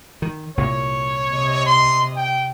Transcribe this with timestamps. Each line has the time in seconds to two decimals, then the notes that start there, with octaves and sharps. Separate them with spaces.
0.22 D#3
0.57 C2 A#2 C#5
1.34 C3 D#5
1.66 C6
2.16 G5